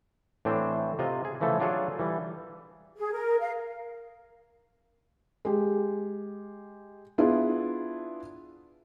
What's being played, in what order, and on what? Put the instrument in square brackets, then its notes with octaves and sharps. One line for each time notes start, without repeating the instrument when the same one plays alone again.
[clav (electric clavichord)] A2 E3 C4 D4 C5
C3 F4 D#5
G#4
C#3 E3 F3 A3 A4
F#3 D4 F4 G#4 A4 C#5
E3 G3
[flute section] G#4
A#4
F5
[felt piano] G#3 G4
B3 D4 E4 F4 G#4